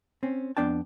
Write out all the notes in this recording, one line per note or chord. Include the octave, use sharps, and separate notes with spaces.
C4 C#4
F2 B3 D4 G5 A5